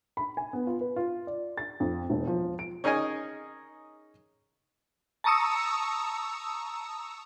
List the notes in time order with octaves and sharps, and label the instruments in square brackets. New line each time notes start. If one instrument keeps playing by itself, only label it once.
[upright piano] B5
G#5
B3
F4
B4
F4
D5
A6
F2
E1
F3
D7
[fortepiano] C#4 D#4 G#4 A#4 D#5 G#5
[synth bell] A5 A#5 C#6 D#6 E6 C#7